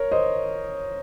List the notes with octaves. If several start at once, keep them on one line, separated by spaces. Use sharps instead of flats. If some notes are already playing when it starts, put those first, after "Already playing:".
Already playing: A#4 C#5
C5 D#5